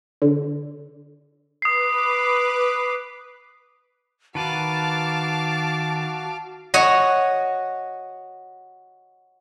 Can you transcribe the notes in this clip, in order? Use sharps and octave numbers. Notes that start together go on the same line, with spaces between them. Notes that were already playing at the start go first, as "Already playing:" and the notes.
D3
B4 D6 D#6 C7
D#3 F#4 B4 F5 A5 D6
F#4 C#5 D#5